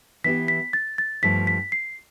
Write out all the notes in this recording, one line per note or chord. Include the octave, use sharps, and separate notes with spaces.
E3 B3 E4 G4 B6
B6
A6
A6
G2 F3 A3 B6
B6
C7